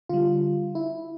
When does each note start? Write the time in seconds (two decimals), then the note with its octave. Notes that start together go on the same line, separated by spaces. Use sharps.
0.09 D3 G3 F4
0.75 E4